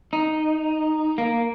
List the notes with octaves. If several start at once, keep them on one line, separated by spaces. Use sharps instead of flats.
D#4
A#3